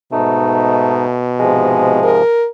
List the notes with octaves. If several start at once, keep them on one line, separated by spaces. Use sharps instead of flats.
G#2 B2 A3 D#4
G#2 C3 F3 G#3
A#4